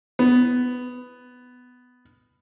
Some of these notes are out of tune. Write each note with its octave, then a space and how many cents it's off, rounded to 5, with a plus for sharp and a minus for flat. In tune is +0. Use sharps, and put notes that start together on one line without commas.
B3 +10